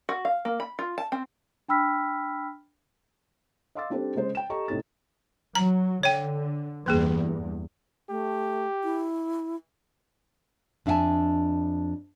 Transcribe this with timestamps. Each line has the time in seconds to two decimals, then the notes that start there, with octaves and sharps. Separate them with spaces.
0.09 F#4
0.25 F5
0.45 A#3
0.60 B5
0.79 F4
0.98 A5
1.12 C4
1.68 D4 G5 B5 E6 F6 B6
3.75 D#5 F5 C6 D6 E6 A6
3.90 G3 C4 D4 G4 A4 C5
4.15 C#3 G#3 C5
4.35 G5 E7
4.50 G4 A4 D#5 A#5 C#6
4.68 A1 A2 C3 D#4 A4 A6
5.55 F#3 A#5
6.03 D3 C#5 G5
6.86 E2 G2 E3 A#3 G#4
8.10 A3 G4
8.84 E4
10.86 F2 D4 E5 F5 G#5 A5